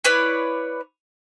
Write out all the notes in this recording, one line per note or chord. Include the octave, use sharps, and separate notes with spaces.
E4 B4 C#5 D5